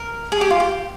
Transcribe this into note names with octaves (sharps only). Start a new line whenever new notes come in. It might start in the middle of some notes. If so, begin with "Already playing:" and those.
Already playing: A#4
G#4
G4
F4
G4